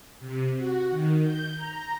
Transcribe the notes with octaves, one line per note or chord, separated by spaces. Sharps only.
C3
F#4
D#3
G6
A#5